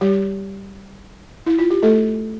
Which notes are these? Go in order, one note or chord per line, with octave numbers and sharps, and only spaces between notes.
G3 G4
E4
F4
G4
A3 A4